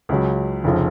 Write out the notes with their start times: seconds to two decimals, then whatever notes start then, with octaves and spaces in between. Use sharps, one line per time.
0.09 C#2 C#3 F#3
0.64 F1 C#3 F3